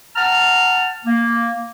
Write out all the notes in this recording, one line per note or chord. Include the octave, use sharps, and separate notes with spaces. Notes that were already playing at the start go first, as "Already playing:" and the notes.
F#5 A5 A#5 F6
A#3